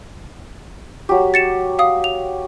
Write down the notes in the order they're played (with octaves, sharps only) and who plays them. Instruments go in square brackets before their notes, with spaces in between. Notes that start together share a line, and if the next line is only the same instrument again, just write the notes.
[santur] F#3 G4
[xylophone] A6 C#7 E7
F5 D#6
F7